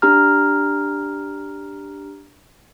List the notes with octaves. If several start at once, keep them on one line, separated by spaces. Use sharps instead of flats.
D4 G4 A#5 F6